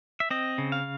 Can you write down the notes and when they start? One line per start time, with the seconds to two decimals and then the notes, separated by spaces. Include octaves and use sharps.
0.20 E5
0.31 C4 D#5
0.58 C#3
0.72 F5